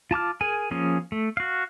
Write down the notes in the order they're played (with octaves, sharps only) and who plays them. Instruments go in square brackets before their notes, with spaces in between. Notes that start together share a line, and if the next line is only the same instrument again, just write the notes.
[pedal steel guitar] F4 A5 D6 F6
G#4 A#4 G#5
F3 A#3 C#4 G#4
A3
F#4 F5